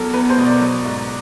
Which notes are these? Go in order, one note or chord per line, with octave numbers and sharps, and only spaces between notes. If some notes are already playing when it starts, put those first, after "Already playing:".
Already playing: E2 F#3 A4 A#4
E2 B4
C5
B2
D5
F#3
G#2